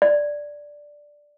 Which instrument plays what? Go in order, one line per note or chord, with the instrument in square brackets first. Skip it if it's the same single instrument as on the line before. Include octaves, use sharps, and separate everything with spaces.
[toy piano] D5